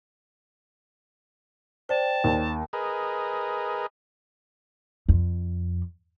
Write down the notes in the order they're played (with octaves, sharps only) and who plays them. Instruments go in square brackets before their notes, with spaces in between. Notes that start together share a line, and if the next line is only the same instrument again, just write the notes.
[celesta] C5 D5 [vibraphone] G5 [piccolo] A5
[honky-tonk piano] D#2
[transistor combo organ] G#4 A#4 B4 D#5
[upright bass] F2